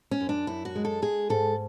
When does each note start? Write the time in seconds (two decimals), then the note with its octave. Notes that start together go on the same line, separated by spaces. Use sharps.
0.11 C#4
0.21 F#2
0.29 D4
0.47 F#2 E4
0.65 F#4
0.75 G#3
0.85 A4
1.02 G#3 G#4
1.30 G#2 A4